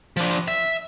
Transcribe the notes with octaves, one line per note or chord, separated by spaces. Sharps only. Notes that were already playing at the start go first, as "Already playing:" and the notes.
F3 D4
E5